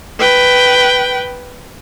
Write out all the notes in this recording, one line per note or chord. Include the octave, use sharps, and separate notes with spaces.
B4 G5